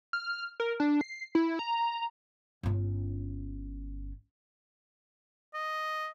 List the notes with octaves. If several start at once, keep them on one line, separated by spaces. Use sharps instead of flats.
F6
A#4
D4
C7
E4
A#5
G1 C#4
D#5